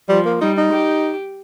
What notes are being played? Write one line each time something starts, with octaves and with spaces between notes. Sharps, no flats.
F3 G3
A#3
G3 D#4
D#4
G4